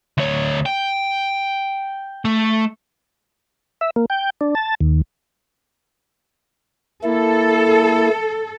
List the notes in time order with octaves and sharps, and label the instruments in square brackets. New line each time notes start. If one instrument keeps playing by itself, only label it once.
[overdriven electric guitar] D2 C#5
G5
A3
[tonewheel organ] E5
A#3
G5
D4
A5
D#2
[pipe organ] A#3 E4 [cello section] A4